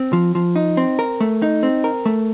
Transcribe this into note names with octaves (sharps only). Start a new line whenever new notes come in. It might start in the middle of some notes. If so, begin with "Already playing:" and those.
Already playing: C4
F3
F3
D#4
C4
A#4
A3
D#4
C4
A#4
A3